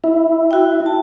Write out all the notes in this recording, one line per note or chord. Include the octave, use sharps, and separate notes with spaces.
E4
F#4 G5
A5